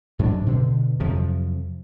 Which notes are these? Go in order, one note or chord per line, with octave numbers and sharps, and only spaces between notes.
G#2 F#3 C#4 D4
B2 D3
F2 C3 F3 F#3